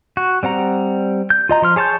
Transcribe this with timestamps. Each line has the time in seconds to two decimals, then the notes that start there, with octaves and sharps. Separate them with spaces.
0.17 F#4
0.43 G3 C4 F#5 A#5
1.30 G6
1.49 F4 D#5 A#5
1.62 F3 C6 F6
1.76 G#4 C#5 A5 C6 G6